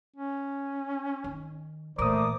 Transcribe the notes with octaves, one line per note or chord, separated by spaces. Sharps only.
C#4
D#3
A#2 E3 A3 A#4 C5 D5 D6 D#6